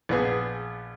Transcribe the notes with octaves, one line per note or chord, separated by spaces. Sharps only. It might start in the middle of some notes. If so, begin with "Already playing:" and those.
A#1 B3 G#4